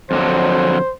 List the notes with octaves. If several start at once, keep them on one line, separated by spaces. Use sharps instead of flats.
F2 D3 F#3 C5